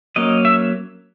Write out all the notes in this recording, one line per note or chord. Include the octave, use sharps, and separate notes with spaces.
F#3 A#3 C#4 D#5
E5